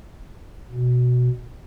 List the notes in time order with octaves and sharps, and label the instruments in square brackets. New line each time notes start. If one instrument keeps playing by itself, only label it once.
[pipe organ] B2